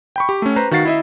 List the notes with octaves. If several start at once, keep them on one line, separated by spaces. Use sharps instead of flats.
G5 B5 C#6
G4
A3 C#4
B4 C5 A#5
D#3 F#4 F5 A6 C7
E4 D#5 E5